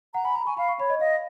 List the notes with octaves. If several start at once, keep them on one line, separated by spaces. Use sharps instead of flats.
F#5 A#5
G#5 B5
A#5 B5
G#5 C#6
F5 B5
C#6
C#5 B5
D#5
D#5 F5